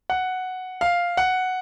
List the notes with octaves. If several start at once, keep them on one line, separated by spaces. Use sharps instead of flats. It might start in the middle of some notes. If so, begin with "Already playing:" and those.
F#5
F5
F#5